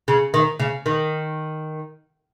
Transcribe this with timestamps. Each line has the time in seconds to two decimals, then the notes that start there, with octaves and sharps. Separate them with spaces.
0.08 C#3
0.34 D#3
0.60 C#3
0.86 D#3